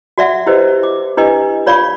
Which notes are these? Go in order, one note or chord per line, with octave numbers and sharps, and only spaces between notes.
F#4 D5 E5 F#5
E4 G4 B4 C5 D#5
D6
D4 E4 G4 B4 D#5
F4 C#5 D5 F5 B5 C#6